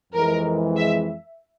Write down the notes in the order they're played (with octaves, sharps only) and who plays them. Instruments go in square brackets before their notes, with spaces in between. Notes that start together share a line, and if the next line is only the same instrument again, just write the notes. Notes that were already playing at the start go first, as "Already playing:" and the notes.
[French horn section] F2 E3 G#3 [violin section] A#4
[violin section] E5